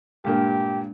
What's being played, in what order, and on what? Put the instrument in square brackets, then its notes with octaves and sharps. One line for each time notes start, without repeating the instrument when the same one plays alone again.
[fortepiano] G2 A#2 A#3 [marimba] G#3 D4 [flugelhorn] G4